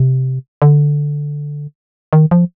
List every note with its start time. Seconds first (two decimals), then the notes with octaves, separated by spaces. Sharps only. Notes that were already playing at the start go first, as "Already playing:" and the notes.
Already playing: C3
0.62 D3
2.13 D#3
2.31 F3